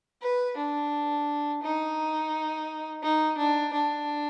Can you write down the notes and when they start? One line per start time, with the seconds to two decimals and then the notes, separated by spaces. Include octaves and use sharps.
0.21 B4
0.57 D4
1.63 D#4
3.03 D#4
3.38 D4
3.73 D4